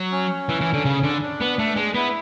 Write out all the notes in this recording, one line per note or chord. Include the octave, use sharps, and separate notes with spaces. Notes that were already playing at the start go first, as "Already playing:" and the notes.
Already playing: F#3
C#4
E3
E3
D3
C#3
D3
D4
B3
A3
G#3
B3 E4